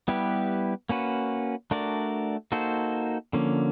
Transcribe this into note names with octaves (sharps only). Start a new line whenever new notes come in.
G3 B3 E4 G4 B4
A#3 C#4 F#4 B4
A3 D4 F#4 A#4 D5
A#3 D#4 F#4 A4 C5
D3 F3 A#3 C#4